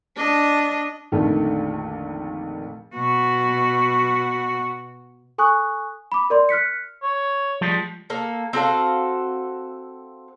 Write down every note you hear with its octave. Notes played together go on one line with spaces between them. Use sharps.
D4 D#5
A#1 F2 D3 D#3 A3
B2 F#4
A4 G#5 C#6 D#6 F#6
B5 D6
A#4 D5 C6
F6 F#6 B6 C#7
C#5
F3 G3 G#3
A#3 A4
C4 F#4 A4 F5